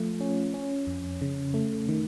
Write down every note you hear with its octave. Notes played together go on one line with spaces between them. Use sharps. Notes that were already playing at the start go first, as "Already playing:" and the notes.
Already playing: F3 A3 F4
C#4
C#4
F2
C#3
A3
D#3